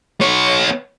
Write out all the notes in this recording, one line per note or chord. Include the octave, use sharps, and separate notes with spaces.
B3 C#5